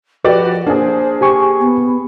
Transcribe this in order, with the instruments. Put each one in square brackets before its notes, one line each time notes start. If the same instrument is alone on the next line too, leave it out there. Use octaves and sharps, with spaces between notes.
[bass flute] F3 [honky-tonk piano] F#4 G4 D5 [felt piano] B4
[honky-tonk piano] A#3 G#4 [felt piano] D4 [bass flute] C5
[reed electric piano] G4 G#5 C#6
[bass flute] B3